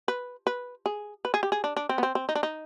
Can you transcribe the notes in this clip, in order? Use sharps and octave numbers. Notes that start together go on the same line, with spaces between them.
B4
B4
G#4
B4
G#4
G4
G#4
D4
D4
C4
B3
C4
C4
D#4
D4
D#4